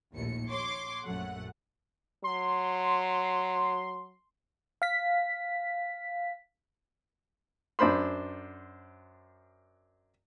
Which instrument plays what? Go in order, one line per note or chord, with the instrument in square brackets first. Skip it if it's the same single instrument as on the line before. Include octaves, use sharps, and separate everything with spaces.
[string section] A#1 D#2 A2 C#7
C#5 C6 D6
A#1 F#2 A3 F#5
[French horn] F#3 [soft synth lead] C6
[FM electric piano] F5 B6
[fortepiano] F#2 D4 C5 B5 C6